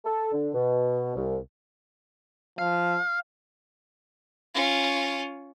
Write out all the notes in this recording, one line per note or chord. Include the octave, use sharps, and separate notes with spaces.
A4
D3
B2
C2
F3 F5
C#4 F4